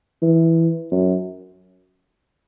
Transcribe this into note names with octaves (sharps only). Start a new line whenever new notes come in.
E3
F#2